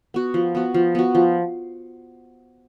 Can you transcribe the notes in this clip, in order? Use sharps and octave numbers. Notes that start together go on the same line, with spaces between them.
B3 F#4
F3
B3 F#4
F3
B3 F#4
F3